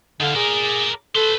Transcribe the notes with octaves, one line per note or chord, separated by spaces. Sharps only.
D3 D#3 F5
G#4 A#4 D5
A4 B4 C6